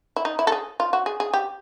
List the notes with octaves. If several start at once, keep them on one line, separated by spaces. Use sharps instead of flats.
E4
D#4
E4
A4
G#4
F4
F#4
G#4
G#4
G4